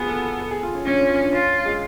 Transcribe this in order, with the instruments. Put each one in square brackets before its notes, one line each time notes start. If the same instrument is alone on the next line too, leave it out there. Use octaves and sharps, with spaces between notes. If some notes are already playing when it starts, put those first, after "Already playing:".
Already playing: [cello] B3 [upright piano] F4 F#4 G#4
[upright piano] A4
A4
A4
G#4
F4
C#4
[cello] C#4 [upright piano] D4
[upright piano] F4
F4
D4
[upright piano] C#4 [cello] F4
[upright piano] G#3